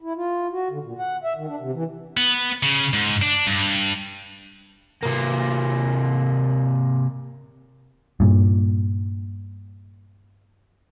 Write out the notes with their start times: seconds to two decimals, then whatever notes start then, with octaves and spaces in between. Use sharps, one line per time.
0.02 E4
0.16 F4
0.52 F#4
0.71 D3
0.83 A#2
0.99 F#5
1.24 E5
1.36 D#3
1.48 D4
1.59 C3
1.73 E3
2.17 B3
2.63 C#3
2.93 G#2
3.22 D4
3.47 G2
5.03 C3 A#3
8.20 G2 A#2